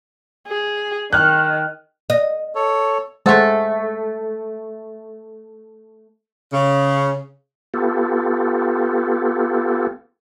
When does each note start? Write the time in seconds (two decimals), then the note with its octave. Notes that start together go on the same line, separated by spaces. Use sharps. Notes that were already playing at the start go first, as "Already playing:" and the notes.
0.48 G#4
1.13 D#3 F6 F#6
2.10 D#5
2.55 A4 C#5
3.26 G#3 A3 A4 C5 F#5
6.53 C#3
7.74 B3 F4 G4 A4